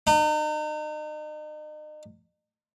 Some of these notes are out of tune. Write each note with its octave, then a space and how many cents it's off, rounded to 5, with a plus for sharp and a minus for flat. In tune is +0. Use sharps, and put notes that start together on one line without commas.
D#4 -35